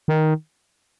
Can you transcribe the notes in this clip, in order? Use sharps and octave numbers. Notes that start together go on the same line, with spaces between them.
D#3